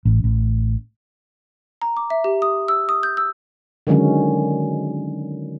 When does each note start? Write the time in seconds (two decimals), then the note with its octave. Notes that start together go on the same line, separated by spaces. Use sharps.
0.05 A1
0.24 A1
1.82 A#5
1.97 D6
2.10 E5
2.24 G4
2.42 D#6
2.68 E6
2.89 D#6
3.03 G6
3.17 E6
3.87 D3 D#3 F#3 G#3 C#4